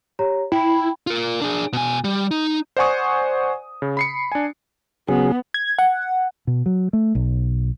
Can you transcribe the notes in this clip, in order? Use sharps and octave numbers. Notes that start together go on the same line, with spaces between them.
G4 C#5 A#5
E4 G5 B5
F4 A#4
D4 G#4
B2 G#5
G3
D#4
C5 D5 F#5 G#5 C#6 D#6
C#3
B5 C7 C#7
D4 G#5
C#3 F#3 B3 G#4
G#6
F#5
B2
F#3
A3
B1